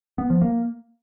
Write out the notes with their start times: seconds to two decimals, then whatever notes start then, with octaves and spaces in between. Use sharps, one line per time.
0.18 B3
0.30 F3
0.42 A#3